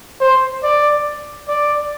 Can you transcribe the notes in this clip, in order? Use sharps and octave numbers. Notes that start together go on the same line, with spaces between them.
C5
D5
D5